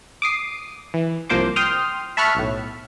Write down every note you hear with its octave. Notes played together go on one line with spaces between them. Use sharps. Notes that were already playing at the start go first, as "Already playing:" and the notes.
D6 D#6 C7
E3
C2 F3 A#3 C5 D6
G5 C6 D#6 F6
E5 A5 B5 C#6 F6 F#6
B1 A2